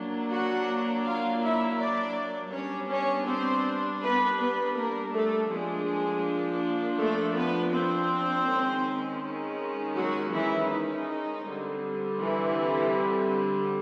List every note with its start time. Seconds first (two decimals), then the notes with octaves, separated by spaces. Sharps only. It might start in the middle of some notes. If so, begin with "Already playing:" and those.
Already playing: F#3 A#3 D4
0.30 F#4 F#5
1.04 F4 F5
1.42 E4 E5
1.79 D4 D5
2.53 G3 B3 C#4 D4 C#5
2.90 C#4 C#5
3.27 C4 C5
4.01 B3 B4
4.39 B3 B4
4.76 A#3 A#4
5.13 A3 A4
5.50 F3 G#3 A#3 D4 G#4
6.98 A3 A4
7.37 B3 B4
7.73 C4 C5
8.47 D#3 G#3 C#4
9.96 F#3 F#4
10.33 E3 E4
10.70 D#4
11.44 D3 G3 C4
12.19 E3 E4